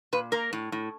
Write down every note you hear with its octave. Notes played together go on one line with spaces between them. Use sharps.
A#2 B4
A#3 A#4
A2
A2